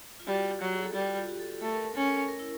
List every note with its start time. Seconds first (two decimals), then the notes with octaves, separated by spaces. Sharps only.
0.20 F4
0.27 G3 F#4
0.61 F#3 G4
0.73 G#4
0.83 A4
0.94 G3 G4
1.02 F4
1.06 F#4
1.16 F4
1.29 G4
1.39 A4
1.50 A4
1.61 A3 A4
1.73 A#4
1.84 A#4
1.95 C#4 A4
2.28 A#4
2.39 E4